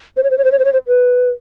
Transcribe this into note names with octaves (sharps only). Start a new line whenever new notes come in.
C5
C#5
C5
C#5
C5
C#5
C5
C#5
C5
B4